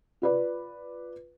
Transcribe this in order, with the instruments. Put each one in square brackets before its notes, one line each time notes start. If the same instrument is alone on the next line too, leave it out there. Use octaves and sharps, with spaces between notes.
[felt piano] F4 B4 D5